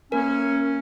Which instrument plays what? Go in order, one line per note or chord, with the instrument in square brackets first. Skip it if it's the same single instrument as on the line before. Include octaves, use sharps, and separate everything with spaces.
[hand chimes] A#3 A#4 [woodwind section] C#4